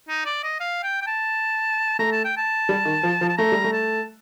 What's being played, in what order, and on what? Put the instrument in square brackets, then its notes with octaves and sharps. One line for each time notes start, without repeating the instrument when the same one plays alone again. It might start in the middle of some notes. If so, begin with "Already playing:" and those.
[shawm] D#4
D5
D#5
F5
G5
G5
A5
[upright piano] A3 [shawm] A#5
[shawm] A5
G5
A5
[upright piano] G3
D#3
F3
F3
[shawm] A5
[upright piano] A3 [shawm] A#5
[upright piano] G3
A3
[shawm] A5